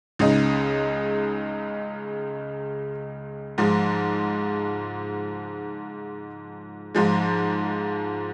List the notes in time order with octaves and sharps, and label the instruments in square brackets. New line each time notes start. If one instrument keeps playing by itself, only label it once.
[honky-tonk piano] C#2 C#3 G#3 D#4
G#2 F3 G#3
G#2 F3 G#3